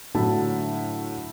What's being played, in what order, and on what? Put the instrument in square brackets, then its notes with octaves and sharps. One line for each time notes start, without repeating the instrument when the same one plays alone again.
[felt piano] A2 D3 F#3 E4 A5